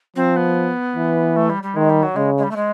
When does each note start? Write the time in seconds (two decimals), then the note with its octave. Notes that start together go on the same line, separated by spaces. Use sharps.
0.16 F3 C4
0.36 B3
0.96 E3
1.36 A3
1.50 G3
1.63 G3
1.76 D#3 G#3
1.89 G3
2.03 F#3
2.16 C#3 G#3
2.38 G#3
2.43 G3
2.51 A3
2.56 G#3